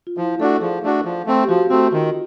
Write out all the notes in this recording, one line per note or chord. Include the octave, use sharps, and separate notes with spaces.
F4
F3 E4
A3 D4 F#4 A4
F3 G#4
A3 D4 F#4
F3
A3 C4
G4
F3 F#4
A3 C4 F#4
D#3 F4